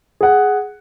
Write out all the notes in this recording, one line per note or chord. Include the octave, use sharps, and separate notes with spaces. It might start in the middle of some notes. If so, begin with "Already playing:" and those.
G#4 F#5